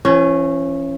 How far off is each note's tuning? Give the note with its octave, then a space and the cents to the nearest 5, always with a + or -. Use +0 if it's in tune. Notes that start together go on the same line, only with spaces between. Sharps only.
E3 +45 C#4 -15